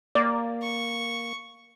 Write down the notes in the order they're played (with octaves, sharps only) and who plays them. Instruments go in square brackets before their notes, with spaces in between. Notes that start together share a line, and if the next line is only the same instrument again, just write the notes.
[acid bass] A#3 [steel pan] D5
[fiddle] C#6